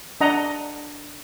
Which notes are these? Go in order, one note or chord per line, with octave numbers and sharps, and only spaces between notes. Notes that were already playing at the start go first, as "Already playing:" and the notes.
D4 D#5 F#5 A#5